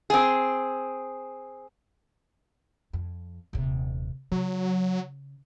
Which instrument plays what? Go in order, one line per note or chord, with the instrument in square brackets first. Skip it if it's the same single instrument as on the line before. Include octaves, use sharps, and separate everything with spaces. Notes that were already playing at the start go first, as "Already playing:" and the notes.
[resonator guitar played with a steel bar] C4 G#4
[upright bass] F2
D#1 C3
[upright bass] C#3 [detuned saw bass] F#3